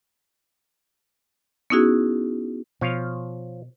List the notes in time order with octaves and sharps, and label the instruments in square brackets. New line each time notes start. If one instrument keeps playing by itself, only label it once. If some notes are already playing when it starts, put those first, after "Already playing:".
[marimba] B3 C#4 D#4 E4 F#4 G#4
[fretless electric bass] B2 [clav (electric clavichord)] F3 C#5 F5